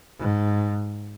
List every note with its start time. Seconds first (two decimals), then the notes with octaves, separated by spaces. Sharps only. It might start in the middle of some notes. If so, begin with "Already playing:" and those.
0.19 G#2